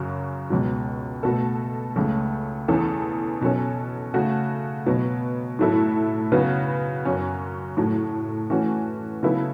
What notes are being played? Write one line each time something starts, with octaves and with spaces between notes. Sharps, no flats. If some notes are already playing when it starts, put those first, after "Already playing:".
Already playing: F#2 C#3 F#3
C#2 B2 F#3
B2 A3 F#4 A4
C#2 C#3 A3
E2 E3 C#4 A4
B2 F#3 C#4 A4
C#3 A3 F#4
B2 F#3 B3
A2 F#3 A3 E4 A4
C#3 F#3 B3 F#4 B4
F#2 F#3 C#4
A2 F#3 A3
E3 A3 C#4 F#4
C#3 F#3 B3 E4 A4